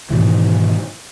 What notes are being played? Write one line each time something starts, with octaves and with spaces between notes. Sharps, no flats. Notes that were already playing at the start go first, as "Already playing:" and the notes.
G#2 B2 D#3 E3